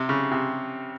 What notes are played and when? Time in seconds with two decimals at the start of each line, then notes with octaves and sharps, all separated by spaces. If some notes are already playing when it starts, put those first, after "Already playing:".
Already playing: C3
0.09 C#3
0.31 C3